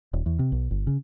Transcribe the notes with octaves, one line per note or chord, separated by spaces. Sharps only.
D#1
E2
C3
B1
G1
C#3